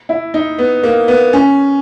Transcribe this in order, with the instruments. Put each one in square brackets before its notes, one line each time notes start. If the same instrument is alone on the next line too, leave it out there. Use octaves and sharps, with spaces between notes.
[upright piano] E4
D#4
B3
A#3
B3
C#4